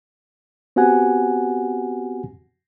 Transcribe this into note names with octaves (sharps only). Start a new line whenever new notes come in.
B3 C4 F#4 G4 F#5 G#5